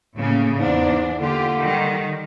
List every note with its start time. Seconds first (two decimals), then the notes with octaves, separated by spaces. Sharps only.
0.16 A2 C#3 A#3
0.59 E2 G#2 D4
1.19 D3 A#3 F4 G4
1.60 D#3 G3